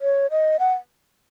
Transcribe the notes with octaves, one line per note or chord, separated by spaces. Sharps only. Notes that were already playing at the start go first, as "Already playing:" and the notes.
C#5
D#5
F#5